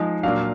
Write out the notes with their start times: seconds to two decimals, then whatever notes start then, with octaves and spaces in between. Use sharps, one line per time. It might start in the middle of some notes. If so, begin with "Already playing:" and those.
Already playing: F3 G#3 D#4
0.23 A#2 F#3 D4 F5